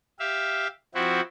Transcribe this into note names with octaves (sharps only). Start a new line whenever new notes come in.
G4 E5 F5
F3 C4 E4 F#4